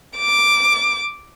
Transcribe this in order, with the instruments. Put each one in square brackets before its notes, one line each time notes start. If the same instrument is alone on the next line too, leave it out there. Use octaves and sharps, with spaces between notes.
[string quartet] D6